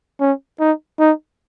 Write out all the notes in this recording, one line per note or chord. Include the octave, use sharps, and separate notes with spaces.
C#4
D#4
D#4